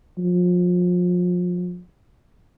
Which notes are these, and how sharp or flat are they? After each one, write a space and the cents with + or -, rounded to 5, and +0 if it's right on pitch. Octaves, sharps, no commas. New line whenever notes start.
F3 +35